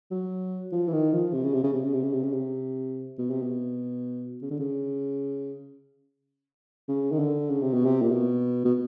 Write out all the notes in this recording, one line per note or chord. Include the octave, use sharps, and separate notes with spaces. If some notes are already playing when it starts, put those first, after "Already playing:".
F#3
F3
E3
D#3
F3
C3
C#3
C3
C#3
C3
C#3
C3
C#3
C3
C#3
C3
B2
C3
B2
C#3
D3
C#3
C#3
D#3
D3
C#3
C3
B2
C3
A#2
B2
B2